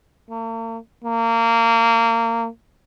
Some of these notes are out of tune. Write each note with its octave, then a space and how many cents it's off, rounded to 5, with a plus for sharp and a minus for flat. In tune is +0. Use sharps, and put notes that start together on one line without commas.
A#3 -45
A#3 -25